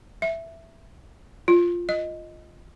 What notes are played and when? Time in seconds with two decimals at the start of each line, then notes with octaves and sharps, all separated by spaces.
0.22 E5
1.48 F4
1.89 D#5